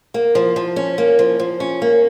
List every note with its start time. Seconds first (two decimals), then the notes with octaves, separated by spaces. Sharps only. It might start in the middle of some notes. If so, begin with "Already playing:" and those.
0.14 A#3
0.35 F3
0.56 F3
0.76 C#4
0.98 A#3
1.19 F3
1.40 F3
1.60 C#4
1.82 A#3